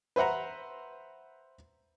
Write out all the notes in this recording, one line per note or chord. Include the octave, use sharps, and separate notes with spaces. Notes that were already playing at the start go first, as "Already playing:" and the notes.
B4 C5 E5 F#5 A#5